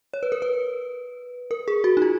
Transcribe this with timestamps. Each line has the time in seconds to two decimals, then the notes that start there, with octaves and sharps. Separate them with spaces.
0.14 C#5
0.23 B4
0.32 A#4
0.42 B4
1.51 A#4
1.68 G#4
1.84 F#4
1.97 D#4
2.02 F4